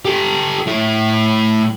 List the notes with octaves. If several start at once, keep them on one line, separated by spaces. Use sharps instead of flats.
G4 A4
A2 E4